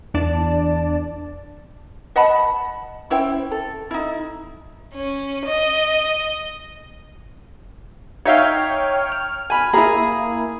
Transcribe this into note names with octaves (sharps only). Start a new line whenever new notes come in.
E2 D4 D5 A5
D#5 F#5 A5 B5
C#4 E4 C5 G5
A4
D#4 E4
C#4
D#5
D#4 C#5 E5 F5 G5 F6
F6
G#5 B5
A#3 E4 G#4 A#5 B5